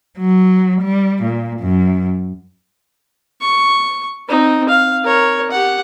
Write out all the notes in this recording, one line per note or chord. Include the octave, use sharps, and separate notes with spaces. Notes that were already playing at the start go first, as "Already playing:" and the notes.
F#3
G3
A#2
F#2
C#6
C4 D#4
F5
A#4 C#5
G4 F#5